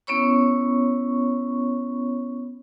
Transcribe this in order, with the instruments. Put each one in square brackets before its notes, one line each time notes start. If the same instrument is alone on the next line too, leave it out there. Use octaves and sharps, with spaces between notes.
[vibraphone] B3 C#4 E4 C#5 B5 C#6